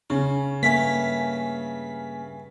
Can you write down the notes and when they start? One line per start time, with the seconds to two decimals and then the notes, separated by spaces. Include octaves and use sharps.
0.10 C#3 C#4
0.63 G2 A3 A#3 F5 G#5 B6